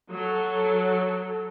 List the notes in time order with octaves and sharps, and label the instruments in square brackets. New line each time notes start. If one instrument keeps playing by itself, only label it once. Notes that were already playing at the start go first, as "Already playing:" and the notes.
[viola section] F#3 A4